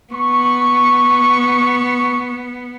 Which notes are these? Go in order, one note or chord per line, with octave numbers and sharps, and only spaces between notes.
B3 C#6